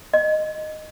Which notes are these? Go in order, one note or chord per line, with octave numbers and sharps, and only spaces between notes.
D#5